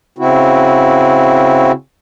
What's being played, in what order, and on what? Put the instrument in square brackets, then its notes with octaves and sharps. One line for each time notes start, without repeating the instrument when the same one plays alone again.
[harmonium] C#3 C4 E4 F#4